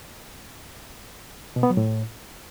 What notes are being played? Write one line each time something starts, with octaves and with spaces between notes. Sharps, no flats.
B2
B3
F#3
A2